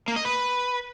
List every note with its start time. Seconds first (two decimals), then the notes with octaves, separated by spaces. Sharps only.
0.08 A#3
0.16 D#5
0.25 B4